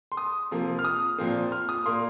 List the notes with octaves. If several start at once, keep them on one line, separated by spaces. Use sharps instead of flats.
C6
D#6
C3 F3 A#3
F6
D#6
A#2 F3 C4
F6
D#6
A#2 A#3 C6